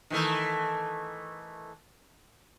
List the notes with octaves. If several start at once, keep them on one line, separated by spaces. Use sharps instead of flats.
D#3 E3 A3